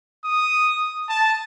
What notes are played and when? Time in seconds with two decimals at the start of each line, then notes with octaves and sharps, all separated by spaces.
0.25 D#6
1.09 A5